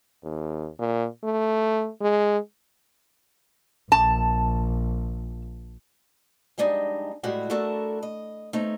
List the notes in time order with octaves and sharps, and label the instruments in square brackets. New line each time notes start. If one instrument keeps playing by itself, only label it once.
[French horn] D#2
A#2
A3
G#3
[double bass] A#1 [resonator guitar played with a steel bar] A5
[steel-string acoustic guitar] F2 G3 G#3 D4 D#4 D#5
A2 G3 G#3 F#4 G4 E5
A3 D4 E4 F#4 A4 A#4
D#5
A3 C4 D#4 C#5